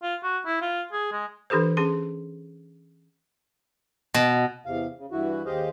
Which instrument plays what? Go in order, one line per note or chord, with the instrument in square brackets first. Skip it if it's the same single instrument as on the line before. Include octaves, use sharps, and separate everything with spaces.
[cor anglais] F4
F#4
E4
F4
G#4
G#3
[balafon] E3 D4 G4 A4 C5
C#4 G#4 C6
[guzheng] B2
[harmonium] E2 C3 F5
C#3
G2 E3 E4 F#4
D#2 G4 G#4 C5 D#5 F5